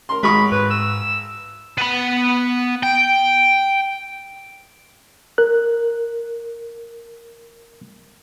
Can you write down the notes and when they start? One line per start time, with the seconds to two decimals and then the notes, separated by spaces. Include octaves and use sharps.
0.09 A#4 C6
0.23 G#1 G#3 B5 C#6 D#6
0.52 G#2 B4
0.71 E6
1.78 B3 B5
2.83 G5
5.38 A#4 F#6